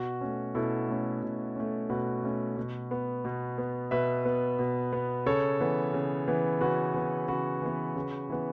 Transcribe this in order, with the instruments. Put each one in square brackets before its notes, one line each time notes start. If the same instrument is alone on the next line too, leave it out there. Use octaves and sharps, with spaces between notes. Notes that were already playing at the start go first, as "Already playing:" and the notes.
Already playing: [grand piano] B2 F#4
A3 C#4
B2 E4 A4
A3 C#4
B2
A3 C#4
B2 F#4 B4
A3 C#4
B2
B3
B2
B3
B2 B4 E5
B3
B2
B3
C#3 A4 C#5
E3 B3
C#3
E3 B3
C#3 F#4 B4
E3 B3
C#3 F#4 B4
E3 B3
C#3
E3 B3